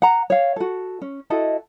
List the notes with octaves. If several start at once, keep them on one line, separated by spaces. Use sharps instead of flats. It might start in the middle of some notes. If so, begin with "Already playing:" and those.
F#5 A#5
C#5 F5
F#4 A4
C#4
E4 F#4 A4 D#5